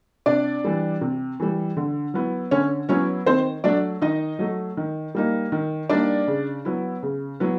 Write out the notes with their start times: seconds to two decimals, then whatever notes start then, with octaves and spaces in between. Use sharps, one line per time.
0.26 C3 D4 D5
0.64 E3 G3
1.01 C3
1.40 E3 G3
1.77 D3
2.14 F#3 B3 E4
2.51 D3 C#4 C#5
2.89 F#3 B3 C#4 E4 C#5
3.26 D#3 C4 C5
3.64 F#3 A3 D4 D5
4.01 D#3 D#4 D#5
4.39 F#3 A3
4.77 D#3
5.15 G3 A#3 D#4
5.52 D#3
5.89 G3 A#3 D4 D#4 D5
6.27 C#3
6.65 F#3 B3 E4
7.03 C#3
7.40 F#3 B3 E4